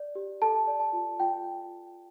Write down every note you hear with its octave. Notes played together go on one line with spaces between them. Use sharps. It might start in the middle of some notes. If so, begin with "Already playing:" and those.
Already playing: D5
G4
A4 A5
D5
A5
F4
F4 G5